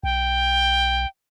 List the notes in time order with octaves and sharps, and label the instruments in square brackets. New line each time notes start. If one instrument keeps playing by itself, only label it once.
[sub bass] B1 [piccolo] G5